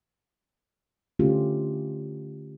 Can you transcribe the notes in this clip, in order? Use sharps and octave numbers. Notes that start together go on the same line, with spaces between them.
D3 A3 C#4 F4 G4